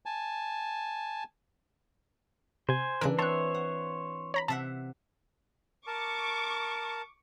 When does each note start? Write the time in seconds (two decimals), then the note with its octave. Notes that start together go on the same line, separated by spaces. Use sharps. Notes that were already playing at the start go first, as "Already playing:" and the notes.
0.06 G#5 A5
2.69 C3 C5 G#5
3.01 C#3 E3 D4 A#4
3.19 C4 C5 C#5 E5 A5 F#6
3.54 F#5
4.34 C#5 A#5 B5
4.48 C3 E5 F#5 A5
5.87 A#4 A5 C#6 D6